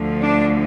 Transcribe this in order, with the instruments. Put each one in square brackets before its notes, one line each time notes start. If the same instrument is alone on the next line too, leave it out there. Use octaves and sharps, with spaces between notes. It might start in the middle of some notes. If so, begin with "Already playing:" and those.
Already playing: [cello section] D2 D3 F3
D4